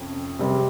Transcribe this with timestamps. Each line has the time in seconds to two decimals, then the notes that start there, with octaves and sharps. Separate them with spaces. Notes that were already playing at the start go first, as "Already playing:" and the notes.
Already playing: F2 C3 C#4
0.39 C3 G3 C4